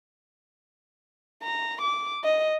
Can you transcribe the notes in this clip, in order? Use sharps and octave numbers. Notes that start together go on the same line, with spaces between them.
A#5
D6
D#5